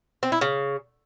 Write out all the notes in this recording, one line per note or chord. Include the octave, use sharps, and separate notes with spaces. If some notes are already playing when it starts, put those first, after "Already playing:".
C4
E4
C#3